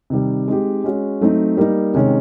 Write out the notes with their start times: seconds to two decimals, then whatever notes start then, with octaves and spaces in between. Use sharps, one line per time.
0.10 C3 D#3 G3
0.48 G#3 C4 D#4 G4
0.84 G#3 C#4 F#4
1.21 F#3 A3 C4 D#4
1.57 G3 A#3 D#4
1.94 C3 D#3 G#3 C#4